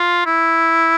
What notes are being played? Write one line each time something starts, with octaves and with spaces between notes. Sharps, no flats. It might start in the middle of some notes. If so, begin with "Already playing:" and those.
Already playing: F4
E4